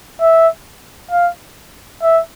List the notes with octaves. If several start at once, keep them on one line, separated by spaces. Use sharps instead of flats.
E5
F5
E5